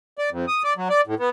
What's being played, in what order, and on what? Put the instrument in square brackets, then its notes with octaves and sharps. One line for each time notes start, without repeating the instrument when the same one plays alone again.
[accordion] D5
F2
D#6
D5
F#3
D5
A2
B3